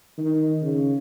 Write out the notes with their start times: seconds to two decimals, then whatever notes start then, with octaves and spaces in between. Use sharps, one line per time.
0.18 D#3
0.62 C#3